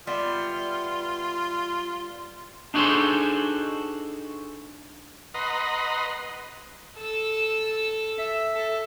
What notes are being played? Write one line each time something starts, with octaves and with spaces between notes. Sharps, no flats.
G3 B3 F4 E5
D4 D#4 F#4 G#4 A4 C5
B4 D#5 F#5 A#5 C6
A4 E6
E5
A4